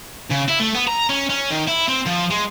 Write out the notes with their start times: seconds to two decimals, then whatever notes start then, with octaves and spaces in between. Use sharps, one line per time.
0.30 C#3
0.48 E4
0.60 A3
0.75 B3
0.87 A#5
1.10 C#4
1.30 C#4
1.50 D#3
1.67 E4
1.88 C4
2.06 F3
2.31 G#3